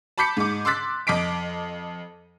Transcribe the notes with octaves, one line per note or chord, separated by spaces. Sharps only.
A5 B5 D6 G6 B6 C#7
G#2 D6
C6 D6 E6 F#6 A6 B6
F2 D#5 D6 B6 D7